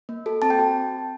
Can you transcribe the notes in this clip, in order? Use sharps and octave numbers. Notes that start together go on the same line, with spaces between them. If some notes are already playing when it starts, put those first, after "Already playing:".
A#3
F#4 A4
C4 A5
G5
F#4 A5